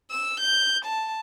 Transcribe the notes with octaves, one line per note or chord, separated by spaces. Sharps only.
E6
G6
A5